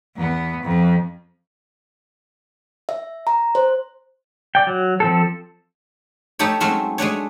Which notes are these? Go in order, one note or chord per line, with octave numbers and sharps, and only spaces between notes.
E2 B3
F2
E5
A#5
C5
D5 G5
F#3
F3 C4 A4
A3 D#4 G4 A4 C#5
F#3 G#3 A3 C4 C#4
G#3 A3 D4 C#5